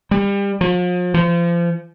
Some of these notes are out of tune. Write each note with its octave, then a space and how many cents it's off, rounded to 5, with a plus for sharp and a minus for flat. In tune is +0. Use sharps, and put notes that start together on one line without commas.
G3 +30
F3 +40
F3 -30